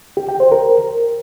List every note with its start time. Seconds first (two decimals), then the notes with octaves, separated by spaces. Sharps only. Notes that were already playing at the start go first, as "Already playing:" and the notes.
0.17 G4
0.29 G5
0.40 C5
0.52 A#4